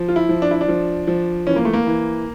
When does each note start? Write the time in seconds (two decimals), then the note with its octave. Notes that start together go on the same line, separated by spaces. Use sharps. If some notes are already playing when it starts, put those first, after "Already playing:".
Already playing: F3
0.08 F4
0.16 E4
0.29 F3
0.42 D4
0.51 E4
0.61 D4
0.68 F3
1.07 F3
1.47 E3 C#4
1.56 A#3
1.65 A3
1.73 A#3
1.86 E3